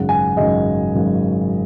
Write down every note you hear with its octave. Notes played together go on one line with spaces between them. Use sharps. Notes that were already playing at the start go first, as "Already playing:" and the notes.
Already playing: G#1 F#2 C#3 F#5
G#5
G#1 F#2 C#3 D#5
G#1 F#2 C#3